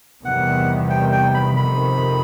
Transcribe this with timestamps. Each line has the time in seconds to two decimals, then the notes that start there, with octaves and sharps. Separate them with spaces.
0.24 E2 C3 D#3 G3 B3 F#5
0.90 G5
1.12 G5
1.34 B5
1.56 F2 C3 D#3 B5